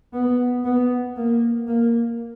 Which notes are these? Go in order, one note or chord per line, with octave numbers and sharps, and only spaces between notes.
B3
B3
A#3
A#3